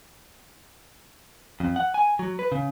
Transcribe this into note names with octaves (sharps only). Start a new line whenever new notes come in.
F2
F#5
G#5
F#3
B4
C#3